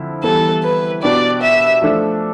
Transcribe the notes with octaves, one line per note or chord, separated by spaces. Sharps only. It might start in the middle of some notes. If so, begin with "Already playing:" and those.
Already playing: D3 F3 C4 E4
E3 G3 B3 E4 A4
B4
B2 B3 D4 G4 D5
E5
F3 A3 D4 A4